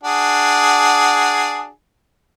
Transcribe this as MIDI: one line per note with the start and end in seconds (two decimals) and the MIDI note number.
0.03 1.69 62
0.03 1.69 66
0.03 1.69 68